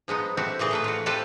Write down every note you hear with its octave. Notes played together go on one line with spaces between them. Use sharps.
F3 G#3 B3 D#4
A3 C4 F#4 G4
A#2 E3 D#4 G#4
A2 A3 B4
F4 F#4
C4 F4 G4 A4 B4